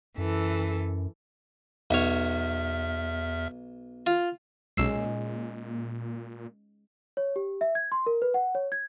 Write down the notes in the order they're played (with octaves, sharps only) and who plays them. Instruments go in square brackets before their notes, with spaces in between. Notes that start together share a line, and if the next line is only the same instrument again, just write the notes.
[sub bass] F#2 [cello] E3 A4
[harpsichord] B1 C#5 [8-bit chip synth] E2 E5 F6
[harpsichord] F4
[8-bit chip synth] B1 E6 C7 [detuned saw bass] A#2 [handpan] G#3 C#4
[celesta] C#5
G4
E5
G#6
C6
A#4
B4
F#5
C#5
G#6